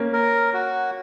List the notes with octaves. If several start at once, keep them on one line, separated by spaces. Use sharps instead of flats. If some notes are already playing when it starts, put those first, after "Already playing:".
Already playing: A#3 C#4
A#4
F#4